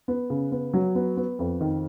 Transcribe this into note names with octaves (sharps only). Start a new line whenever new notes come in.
B3
C#3
B3
F#3
B3
B3
F2
D#3